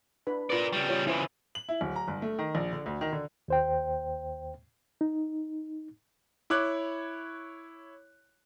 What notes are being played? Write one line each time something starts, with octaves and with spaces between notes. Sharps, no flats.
D4 B4 B5
F4 A#4 B4 D5
C#3 G3 C#6
F4 C#5
C#3 E3 E4 C5 D6
F#7
E4
D1
A#5
G1
A3
D#3
A#1
D3
D2
D#3
D3
D#2 C5 G5
D#4
E4 C#5 D6 F#6